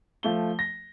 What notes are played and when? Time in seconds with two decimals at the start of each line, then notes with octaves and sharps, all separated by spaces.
0.23 F3 A3 G7
0.59 A#6